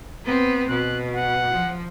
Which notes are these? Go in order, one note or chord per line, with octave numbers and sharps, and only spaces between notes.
B3 C4
B2 F#6
F#5
F3